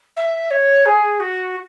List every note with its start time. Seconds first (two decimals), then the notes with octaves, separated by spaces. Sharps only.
0.16 E5
0.50 C#5
0.85 G#4
1.20 F#4